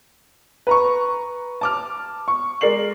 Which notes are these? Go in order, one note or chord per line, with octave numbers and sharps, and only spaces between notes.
B4 A#5 C#6
A5 D6 F6
C#6
G#3 A#4 D5 C7 F#7